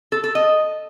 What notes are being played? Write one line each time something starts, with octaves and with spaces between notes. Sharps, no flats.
A4
A4
D#5